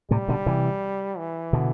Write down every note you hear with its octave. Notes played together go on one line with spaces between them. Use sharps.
A2 C3 G3
B2 D3
C3 E3
E3
B2 D3